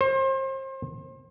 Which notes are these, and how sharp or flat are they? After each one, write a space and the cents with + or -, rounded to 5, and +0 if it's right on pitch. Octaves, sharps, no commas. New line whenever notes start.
C5 +35